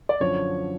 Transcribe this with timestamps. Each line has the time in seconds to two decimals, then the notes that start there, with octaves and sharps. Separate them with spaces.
0.09 D5
0.20 F#2 D3 F3 C#5